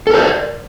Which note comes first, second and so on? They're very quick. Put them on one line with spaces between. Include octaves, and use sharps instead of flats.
A4 A#4 C5 D5